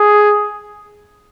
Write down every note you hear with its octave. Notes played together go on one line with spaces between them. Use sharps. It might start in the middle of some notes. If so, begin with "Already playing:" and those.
Already playing: G#4